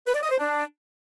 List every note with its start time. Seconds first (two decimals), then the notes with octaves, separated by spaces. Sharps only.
0.07 B4
0.15 D5
0.23 D#5
0.31 C5
0.39 D4